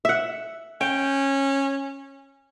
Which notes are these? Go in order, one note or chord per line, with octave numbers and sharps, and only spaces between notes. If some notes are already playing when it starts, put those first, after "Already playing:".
E5 F#5
C#4 G5